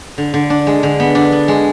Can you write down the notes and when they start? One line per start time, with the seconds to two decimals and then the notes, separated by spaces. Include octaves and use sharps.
0.18 D3
0.34 D3
0.50 D4
0.67 G#3
0.83 D3
1.00 B3
1.15 D4
1.32 B3
1.48 G#3